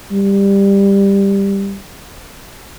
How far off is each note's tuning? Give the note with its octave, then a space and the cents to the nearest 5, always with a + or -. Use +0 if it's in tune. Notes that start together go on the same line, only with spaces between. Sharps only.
G3 +15